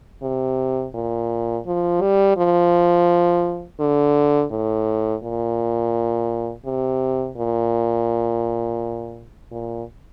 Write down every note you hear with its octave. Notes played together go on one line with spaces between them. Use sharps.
C3
A#2
F3
G3
F3
D3
A2
A#2
C3
A#2
A#2